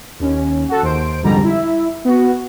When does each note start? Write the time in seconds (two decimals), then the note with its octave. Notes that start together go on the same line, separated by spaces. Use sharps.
0.20 D#2 C#4
0.69 F#4 A4
0.82 D#2 C5 D7
1.22 C2 F2 G#2 D3 G3 A#5
1.44 E4 E5
2.05 B3 F#4